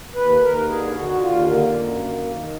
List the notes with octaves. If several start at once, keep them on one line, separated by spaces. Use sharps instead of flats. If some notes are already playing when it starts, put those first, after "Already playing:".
D#2 B4
D#2 A#4
D3 G#4
D3 F#4
D#2 F4
D3 A#3
F#2
D#3
D#3